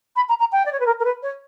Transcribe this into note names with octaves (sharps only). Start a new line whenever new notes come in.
B5
A#5
A#5
G5
D5
C#5
B4
A#4
A#4
B4
C#5